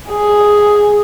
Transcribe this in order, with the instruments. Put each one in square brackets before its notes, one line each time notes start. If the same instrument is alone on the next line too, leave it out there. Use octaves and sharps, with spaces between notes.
[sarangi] G#4